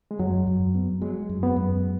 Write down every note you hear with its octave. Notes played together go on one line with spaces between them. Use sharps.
G#3
F#2 F#3
F#2
B3
F#3 G#3
F#2
B3
F#2